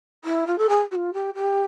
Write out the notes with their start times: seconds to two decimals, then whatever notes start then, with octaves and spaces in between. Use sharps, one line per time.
0.24 E4
0.47 F4
0.58 A4
0.69 G#4
0.91 F#4
0.95 F4
1.13 G4
1.35 G4